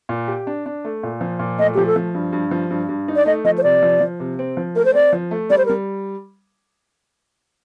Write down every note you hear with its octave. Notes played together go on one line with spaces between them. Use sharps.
A#2
G4
D4
D4
A3
A#2
F3
A#2
A3 D#5
F3 G4
A4
F3
G2
G2
F3
G2
G2
D#4
D5
A3 D#5
F3 D#5
C5
C3 D5
F3
F3
C3
C4
F3
A3 A#4
C5
C4 D5
F3
A3
G3 D5
C5
A#4
G3